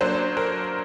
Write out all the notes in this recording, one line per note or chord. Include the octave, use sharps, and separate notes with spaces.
F#3 A#3 D4 C5
A#4